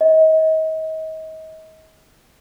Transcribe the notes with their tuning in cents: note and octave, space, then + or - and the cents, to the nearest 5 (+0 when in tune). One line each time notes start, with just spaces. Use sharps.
D#5 +35